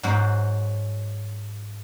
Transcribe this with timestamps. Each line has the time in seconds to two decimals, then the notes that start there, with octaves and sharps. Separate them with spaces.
0.03 G#2 F#3 F#4 C5